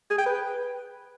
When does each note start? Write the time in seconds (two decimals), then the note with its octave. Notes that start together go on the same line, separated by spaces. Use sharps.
0.10 G#4
0.18 G5
0.26 B4